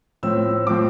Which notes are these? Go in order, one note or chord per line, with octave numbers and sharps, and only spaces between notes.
A2 F3 C4 E6
A2 F3 C4 D6